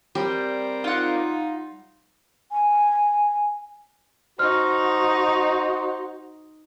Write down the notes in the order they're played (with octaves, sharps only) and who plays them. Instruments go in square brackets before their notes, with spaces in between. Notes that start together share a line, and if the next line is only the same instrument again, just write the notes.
[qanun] G3 [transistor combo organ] C4 A#4 D5
[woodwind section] D#4 [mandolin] F4 F#5
[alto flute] G#5
[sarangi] D#4 [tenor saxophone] F#4 [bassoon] C5 [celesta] F6